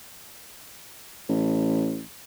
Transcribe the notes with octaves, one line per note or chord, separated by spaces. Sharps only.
A1